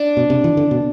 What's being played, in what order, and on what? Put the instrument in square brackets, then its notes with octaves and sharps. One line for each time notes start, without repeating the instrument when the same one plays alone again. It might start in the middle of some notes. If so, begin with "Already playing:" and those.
Already playing: [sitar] D4
[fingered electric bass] B2
C3
E3
D3
B2